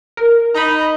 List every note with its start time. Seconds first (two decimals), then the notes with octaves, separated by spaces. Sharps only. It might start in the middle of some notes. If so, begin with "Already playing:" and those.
0.17 A#4
0.55 D#4 A#5 B5